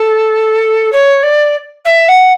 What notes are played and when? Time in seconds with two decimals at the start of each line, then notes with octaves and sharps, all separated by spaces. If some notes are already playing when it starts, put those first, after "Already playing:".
Already playing: A4
0.92 C#5
1.23 D5
1.85 E5
2.08 F#5